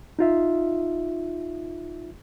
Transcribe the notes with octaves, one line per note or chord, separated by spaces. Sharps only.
D#4 F4 E5